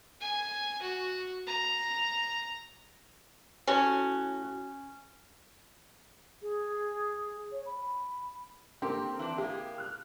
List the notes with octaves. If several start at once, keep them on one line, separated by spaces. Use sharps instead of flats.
G#5
F#4
A#5
A2 C#4 F#4 G#5
G#4
C#5
B5
D3 A#3 C4 G4
E3 D4
G#3 A#3 G4
F6 F#6